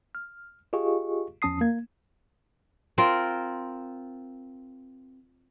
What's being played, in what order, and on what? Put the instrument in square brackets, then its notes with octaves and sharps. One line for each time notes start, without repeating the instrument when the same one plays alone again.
[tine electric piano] F6
F4 G4 G#4 D#5 F5 C#6
E2 F3 C#4 A5 D#6 C7
A#3 G#6
[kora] C4 F4 A#4